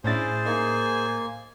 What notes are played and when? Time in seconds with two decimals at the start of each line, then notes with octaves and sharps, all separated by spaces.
0.04 A2 C#4 D4 E4 G#4 C5 A6
0.45 A#3 D#4 G#5